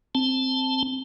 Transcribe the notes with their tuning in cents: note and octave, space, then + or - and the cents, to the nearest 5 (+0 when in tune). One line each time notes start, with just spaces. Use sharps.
C4 +0 A5 +0